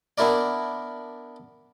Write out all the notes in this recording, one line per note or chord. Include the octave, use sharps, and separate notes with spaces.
B3 D4 E4 A#4 D5